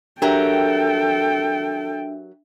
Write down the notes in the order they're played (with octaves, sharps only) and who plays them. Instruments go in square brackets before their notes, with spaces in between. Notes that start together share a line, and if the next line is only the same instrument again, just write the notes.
[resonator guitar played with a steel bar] F#3 G4 A#4 [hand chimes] D4 E5 [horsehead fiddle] A4 G5